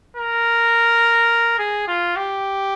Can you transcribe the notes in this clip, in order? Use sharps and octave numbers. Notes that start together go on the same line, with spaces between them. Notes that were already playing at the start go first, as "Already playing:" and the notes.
A#4
G#4
F4
G4